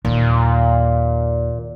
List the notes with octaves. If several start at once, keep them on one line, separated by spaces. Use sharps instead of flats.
D#2 A#2